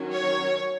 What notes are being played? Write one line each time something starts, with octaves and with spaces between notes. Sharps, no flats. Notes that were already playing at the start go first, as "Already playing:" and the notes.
Already playing: D#3 F#3 C#4
C#5